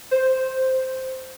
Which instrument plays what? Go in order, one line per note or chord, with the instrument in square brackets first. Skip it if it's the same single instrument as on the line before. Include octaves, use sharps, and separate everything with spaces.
[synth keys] C5